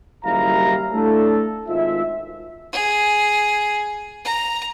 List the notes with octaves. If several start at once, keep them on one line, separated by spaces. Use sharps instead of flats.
F#1 D#2 G3 E4 F5 A#5
A3 D4 E4 A4
G#1 G#2 F4 E5
G#4
A#5